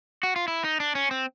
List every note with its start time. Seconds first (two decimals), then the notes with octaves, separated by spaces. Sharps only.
0.23 F#4
0.36 F4
0.48 E4
0.64 D#4
0.80 D4
0.95 C#4
1.11 C4